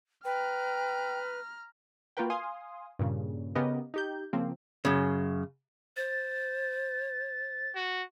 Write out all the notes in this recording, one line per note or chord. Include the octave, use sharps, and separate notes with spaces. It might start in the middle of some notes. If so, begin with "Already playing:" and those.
B4 G5 A#5 F6
A#3 F4 F#4 A#4 B4 G5
F5 G#5 C6 D#6
G2 A#2 C#3
C#3 B3 G4 A#4 D#5
D#4 G4 G6
C#3 F3 A#3 C4
F#2 C#3
C5 A6
F#4